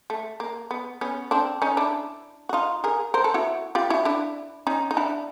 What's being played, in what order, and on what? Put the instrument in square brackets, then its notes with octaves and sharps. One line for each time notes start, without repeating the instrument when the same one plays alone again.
[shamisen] A3
A#3
B3
B3 C#4
C4 D4
C#4 D#4
D4 E4
F#4
D#4 F4
G#4 A#4
A#4 C5
A4 B4
E4 F#4
F4 G4
E4 F#4
D4 E4
C#4 D#4
D#4
D4 E4